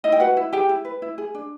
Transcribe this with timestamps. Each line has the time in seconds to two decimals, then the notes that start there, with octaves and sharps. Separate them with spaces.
0.04 D#4 E4 D#5
0.12 G5
0.20 F#4 B4 F#5
0.37 E4
0.53 G4 G#4 G5
0.69 E4
0.85 B4
1.02 E4
1.18 G#4
1.35 D4